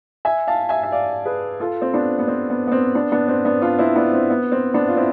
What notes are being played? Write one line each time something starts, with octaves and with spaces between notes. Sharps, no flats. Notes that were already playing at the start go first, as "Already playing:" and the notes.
E5 G#5
F5 A5
E5 G#5
E5
D5 F5
G#4 B4
F4 A4
C4
B3 D4
B3
C4
B3
B3
C4
B3 D4
B3 D4
C4
B3 D4
D4 F4
C4 E4
B3 D4
C4
B3
C4
B3 D4
F4
C4 E4